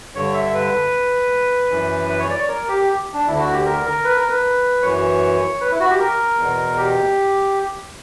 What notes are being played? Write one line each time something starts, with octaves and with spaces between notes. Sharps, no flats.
G2 D3 C#5
E5
B4
F#2 E3
B4
C#5
D5
C#5
A#4
G4
D4
D2 D3 E4
F#4
G4
A#4
A#4
B4
A#4
B4
F#2 E3 C#5
B4
E4
F#4
G4
A#4
E2 B2
G4